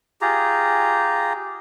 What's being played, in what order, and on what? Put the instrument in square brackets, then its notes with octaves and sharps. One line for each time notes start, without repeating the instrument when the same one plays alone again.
[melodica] F4 G4 G#4 A#5